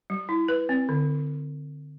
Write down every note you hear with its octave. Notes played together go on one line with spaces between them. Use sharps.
G3
E4
B4
C4
D3